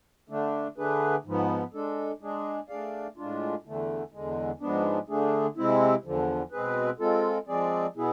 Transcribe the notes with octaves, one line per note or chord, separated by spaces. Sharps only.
D3 A3 D4
D3 A3 D4 G#4 B4
G#2 F3 B3
G#3 D4 A4
G#3 D4 G#4
A3 D4 G#4 D5 F5
A2 G#3 D4 F4
E2 D3 A3
E2 D3 G#3
G#2 F3 G#3 B3 D4
D3 A3 D4 G#4
C3 G#3 C4 E4
E2 D3 F3
B2 G#3 C4 G#4 B4
G#3 C4 F4 A4
F3 G#3 C4 G#4 D5
B2 B3 E4 G#4